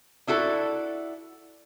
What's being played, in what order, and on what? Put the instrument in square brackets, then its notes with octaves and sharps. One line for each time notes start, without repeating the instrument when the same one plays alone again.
[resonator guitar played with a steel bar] D4 E4 F#4 A4